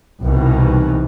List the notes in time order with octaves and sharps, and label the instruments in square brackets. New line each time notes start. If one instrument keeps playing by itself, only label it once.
[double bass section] C2 B2 D#3 E3